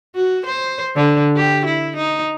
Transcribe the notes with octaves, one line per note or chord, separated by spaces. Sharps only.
F#4
C5
D3
G4
E4
D#4